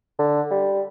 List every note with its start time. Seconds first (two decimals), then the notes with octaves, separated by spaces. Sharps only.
0.19 D3
0.51 G3